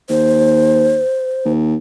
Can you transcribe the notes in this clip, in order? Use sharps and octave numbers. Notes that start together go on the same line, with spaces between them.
D#2 C5
D#2